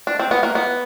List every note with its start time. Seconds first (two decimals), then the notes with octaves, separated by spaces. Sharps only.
0.07 D4
0.19 C4
0.31 B3
0.43 A#3
0.55 B3